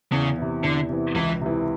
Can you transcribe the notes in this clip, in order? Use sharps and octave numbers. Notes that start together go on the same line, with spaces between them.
E2 C#3
C3 E3
E2 D3
C3 E3
C#2 E3
C3 E3